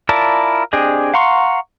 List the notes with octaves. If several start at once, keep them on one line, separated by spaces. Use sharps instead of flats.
E4 F4 A#4 D5 A5
C4 D4 G4 G#4 D#5
F5 F#5 A#5 C6 C#6